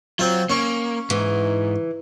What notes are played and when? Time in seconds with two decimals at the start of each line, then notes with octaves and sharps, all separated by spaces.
0.19 F#3 C4 F4
0.50 A#3 C#4 C#6
1.10 G#2 E3